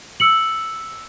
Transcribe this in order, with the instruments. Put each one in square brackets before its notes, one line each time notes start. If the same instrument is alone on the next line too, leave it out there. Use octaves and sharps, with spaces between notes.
[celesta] E6 C#7 F#7